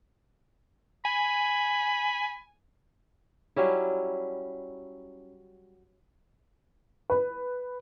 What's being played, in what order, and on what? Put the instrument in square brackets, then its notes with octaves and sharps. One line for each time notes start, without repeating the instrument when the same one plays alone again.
[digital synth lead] G#5 [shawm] B5
[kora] F#3 G3 C#4 E4
[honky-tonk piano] B4